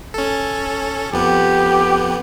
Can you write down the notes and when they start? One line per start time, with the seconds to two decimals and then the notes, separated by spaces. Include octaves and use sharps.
0.14 C#4 A4
1.13 F2 B3 G4